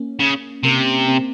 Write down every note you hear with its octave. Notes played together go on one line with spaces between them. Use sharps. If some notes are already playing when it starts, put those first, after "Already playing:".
Already playing: A#3 C#4
C#3
C3 A#3
C4